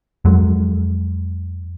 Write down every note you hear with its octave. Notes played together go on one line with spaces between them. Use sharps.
F2 F#3 G#3